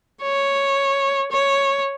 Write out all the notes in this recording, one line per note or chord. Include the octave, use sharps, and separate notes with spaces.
C#5
C#5